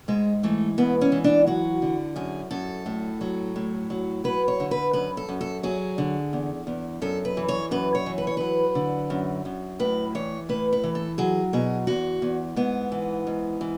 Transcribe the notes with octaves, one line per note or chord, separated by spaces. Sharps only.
G#2 G#3
E3 A3
G#2 B3
C#4
E3
D4
F#3 F#4
D3
F#2 G#4
F#2 A4
A2
F#3
A2
F#3
F#3 B4
C#5
D3
B4
F#2 B4
A4
F#2
A4
F#3 G#4
D3
E2
E2
F#2 A4
B4
E3
C#5
F#2 B4
C#5
E3
B4
C#5
F#3 B4
D3
F#2
F#2
A2 B4
E3 C#5
A2 B4
B4
E3
A4
F#3 G#4
B2 G#4
E2 F#4
E2
G#2 B3
E3
G#2
E3